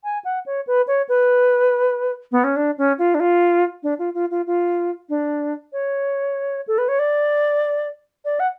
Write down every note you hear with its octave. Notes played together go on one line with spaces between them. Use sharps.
G#5
F#5
C#5
B4
C#5
B4
B3
C#4
D4
C#4
F4
D4
F4
D4
F4
F4
F4
F4
D4
C#5
A4
B4
C#5
D5
D5
F#5